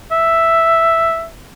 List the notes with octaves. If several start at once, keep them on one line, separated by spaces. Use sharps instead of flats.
E5